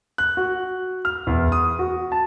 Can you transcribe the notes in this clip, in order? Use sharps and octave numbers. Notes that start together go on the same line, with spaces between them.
F#6
F#4
F6
E2
D#6
F#4
A5